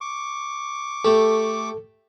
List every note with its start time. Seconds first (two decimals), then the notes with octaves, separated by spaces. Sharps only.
0.01 C#6 D6
1.04 A3 G4 A4